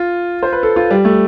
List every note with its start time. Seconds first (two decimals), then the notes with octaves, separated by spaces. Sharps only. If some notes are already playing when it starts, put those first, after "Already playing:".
Already playing: F4
0.43 C5
0.53 B4
0.63 A4
0.76 F4
0.91 G3
1.05 A3